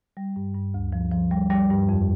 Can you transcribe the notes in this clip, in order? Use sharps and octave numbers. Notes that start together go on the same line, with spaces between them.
G3
G2
G2
D2
F3
F3
G3
G3
G2
F2